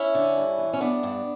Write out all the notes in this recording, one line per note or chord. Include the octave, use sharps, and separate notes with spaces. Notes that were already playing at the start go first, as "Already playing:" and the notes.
Already playing: C#4 E4
D3
G2
E3
C#4
G2 B3 D4
G2